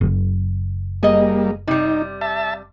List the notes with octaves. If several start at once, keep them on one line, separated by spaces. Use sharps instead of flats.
F#1
G3 A#3 G#4 D#5
C3 G3 D#4
E5 A5